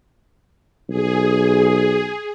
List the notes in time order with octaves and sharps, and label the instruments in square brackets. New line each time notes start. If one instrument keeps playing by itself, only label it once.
[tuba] B1 [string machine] G#4